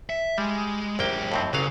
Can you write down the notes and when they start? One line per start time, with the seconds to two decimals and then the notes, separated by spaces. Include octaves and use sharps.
0.10 E5
0.38 G3 G#3
0.99 A#1 F#2 A#3 G4 G5
1.32 D#2 A2 C4
1.53 A1 C#3 F#3 F5